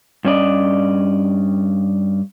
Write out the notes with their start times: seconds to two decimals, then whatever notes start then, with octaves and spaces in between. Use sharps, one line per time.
0.25 G2 C#4 D5 D#5